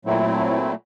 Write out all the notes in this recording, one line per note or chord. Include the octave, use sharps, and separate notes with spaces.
A#2 F#3 A3 C4 E4